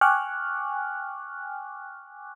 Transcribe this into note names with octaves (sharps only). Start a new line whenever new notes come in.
G5 G#5 C#6 D6 F6 F#6